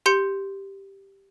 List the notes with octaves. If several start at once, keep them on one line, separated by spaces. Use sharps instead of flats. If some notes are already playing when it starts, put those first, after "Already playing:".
G4 C6 G6 C#7